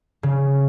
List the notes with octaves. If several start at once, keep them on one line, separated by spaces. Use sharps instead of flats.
C#3